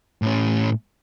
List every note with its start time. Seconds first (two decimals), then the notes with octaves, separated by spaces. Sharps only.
0.22 A2 C#4